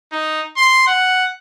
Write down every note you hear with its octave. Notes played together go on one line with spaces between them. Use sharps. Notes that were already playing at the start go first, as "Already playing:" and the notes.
D#4
C6
F#5